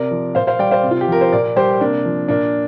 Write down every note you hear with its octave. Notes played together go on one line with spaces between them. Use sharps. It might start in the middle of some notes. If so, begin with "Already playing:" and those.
Already playing: C3 A#4 D5
F3
A#2 C5 F5
C5 F5
G3 D5 G5
C5 F5
C3
F4
G4
F3 A#4
C5
A#2 A#4 D5
G3 G4 C5
C3 A#3 D4
F3
A#2 A#3 D4